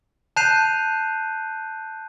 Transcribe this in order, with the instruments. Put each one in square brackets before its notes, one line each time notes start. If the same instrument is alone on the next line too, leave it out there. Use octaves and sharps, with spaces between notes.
[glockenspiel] A5 F#6 G6 C7 D#7 F7